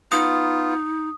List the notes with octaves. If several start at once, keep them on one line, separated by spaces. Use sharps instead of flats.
B3 D#4 F4 D#6